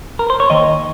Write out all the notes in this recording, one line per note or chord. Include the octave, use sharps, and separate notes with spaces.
A#4
C5
C#5
D#2 D#3 D#5